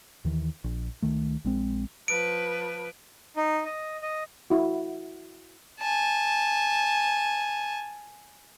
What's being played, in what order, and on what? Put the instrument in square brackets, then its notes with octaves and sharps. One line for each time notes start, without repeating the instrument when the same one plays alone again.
[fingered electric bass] D#2 D#3 E3
A#1
C#2 D#3 A3
A#1 G#3 C4
[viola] F3 B4 [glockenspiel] D7
[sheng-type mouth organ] D#4
D#5
D#5
[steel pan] E4 F#4
[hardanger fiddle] G#5 A5